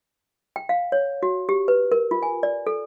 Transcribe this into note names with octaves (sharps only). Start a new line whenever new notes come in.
G5
F5
C#5
F#4
G4
B4
A#4
F4
G#5
D5
A4